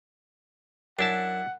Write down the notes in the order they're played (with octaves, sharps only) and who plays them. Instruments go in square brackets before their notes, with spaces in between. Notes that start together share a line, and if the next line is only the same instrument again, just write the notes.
[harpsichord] F#2 [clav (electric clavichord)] D4 E4 A5 [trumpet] F#5